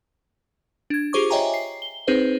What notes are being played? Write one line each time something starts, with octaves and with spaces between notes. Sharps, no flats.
D4 G#6
F4 G4 G#4 C5 C#6 D6
C#5 D#5 E5 G5 G#5 A#5
C7
G7
C4 D#4 G#4 B4 C5